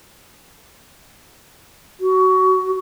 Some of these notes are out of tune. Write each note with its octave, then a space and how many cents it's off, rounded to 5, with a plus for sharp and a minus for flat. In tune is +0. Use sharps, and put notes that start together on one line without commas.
F#4 +20